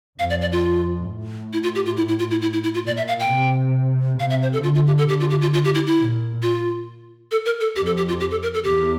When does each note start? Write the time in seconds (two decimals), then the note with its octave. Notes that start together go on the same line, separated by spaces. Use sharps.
0.19 F2 F5
0.30 D5
0.41 D5
0.52 F4
1.08 A2
1.53 E4
1.63 F4
1.75 G4
1.86 F4
1.97 E4
2.08 E4
2.19 F4
2.31 E4
2.42 E4
2.53 E4
2.63 E4
2.74 F4
2.86 A#2 D5
2.97 E5
3.08 F5
3.20 G5
3.31 C3
4.19 C3 F5
4.30 E5
4.42 C5
4.53 A4
4.63 D3 F4
4.75 F4
4.87 G4
4.98 A4
5.09 D3 G4
5.20 F4
5.30 G4
5.41 F4
5.54 F4
5.65 G4
5.75 E4
5.87 E4
5.98 A#2
6.42 F4
7.31 A4
7.45 A#4
7.60 A4
7.76 F2 G4
7.86 A4
7.97 G4
8.08 F4
8.20 G4
8.31 A4
8.43 A#4
8.54 A4
8.64 E2 G4